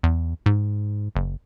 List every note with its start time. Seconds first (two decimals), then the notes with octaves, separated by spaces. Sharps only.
0.03 E2
0.46 G#2
1.16 F#1